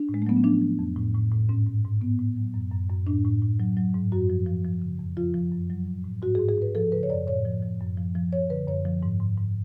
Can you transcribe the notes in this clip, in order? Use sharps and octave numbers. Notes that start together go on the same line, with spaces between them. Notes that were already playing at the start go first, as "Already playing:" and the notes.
Already playing: D4
A2
G#3
A3
F#3 B3
C#4
F3 D4
F3
F2
A2
A2
A2
G#2 C#4
G#2
G#2
A2 B3
A2
F#3
F#2
F#2
F#2
A2 D4
A2
A2
F#3
F#3
G#2
F#2 F#4
F3
F3
F3
C#3
F2
F3 F4
F3
F#2
F#3
A2
A2
G#2 F#4
G#4
G#2
G#4
G#2 B4
F3 A4
C#3 B4
C#5
F#2 D5
A2 C#5
F3
F3
F#2
F3
F3
F3 C#5
D3 B4
F#2 C#5
F3
G#2
G#2
G#2